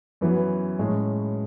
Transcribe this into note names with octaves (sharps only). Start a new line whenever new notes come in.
F#2 E3 B3
A2 G#3 C#4